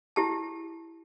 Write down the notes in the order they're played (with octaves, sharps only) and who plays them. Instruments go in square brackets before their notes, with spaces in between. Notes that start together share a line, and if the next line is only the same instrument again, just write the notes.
[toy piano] E4 G4 A5